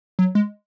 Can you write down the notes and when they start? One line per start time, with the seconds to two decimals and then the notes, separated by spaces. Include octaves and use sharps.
0.19 F#3
0.35 G#3